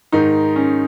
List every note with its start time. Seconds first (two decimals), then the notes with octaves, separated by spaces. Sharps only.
0.12 G#2 D#3 D#4
0.56 C#4